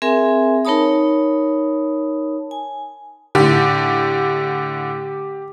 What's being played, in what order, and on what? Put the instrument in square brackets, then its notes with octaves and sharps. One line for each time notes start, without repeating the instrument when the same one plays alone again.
[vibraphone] C4 G#4 A#4 E5 G#5
D#4 A#4 C#5 A5 B5 D#6
G#5
[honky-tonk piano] A2 D3 [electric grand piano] G4